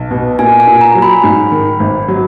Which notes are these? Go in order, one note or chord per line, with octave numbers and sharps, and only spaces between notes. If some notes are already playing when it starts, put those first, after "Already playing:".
Already playing: B1
B2
A#2 G#5
G#5
A#2
A#5
F#3
B5
G#2
D#3
G#1
F#3